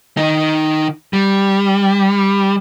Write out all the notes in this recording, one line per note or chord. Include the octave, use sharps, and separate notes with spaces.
D#3 D#4
G3